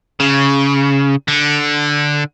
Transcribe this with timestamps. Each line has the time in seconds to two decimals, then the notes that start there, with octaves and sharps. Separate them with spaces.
0.20 C#3
1.28 D3